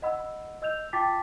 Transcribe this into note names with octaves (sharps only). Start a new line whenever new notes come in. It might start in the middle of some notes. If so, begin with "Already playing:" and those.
D#5 F#5 B5 E6
D#5 E6 G6 F7
F4 G5 A5 D6 A6 B6